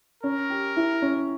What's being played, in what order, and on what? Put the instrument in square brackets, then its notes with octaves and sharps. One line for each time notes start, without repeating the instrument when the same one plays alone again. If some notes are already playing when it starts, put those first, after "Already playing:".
[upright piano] C#4 [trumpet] A#4
[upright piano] G4
E4
C#4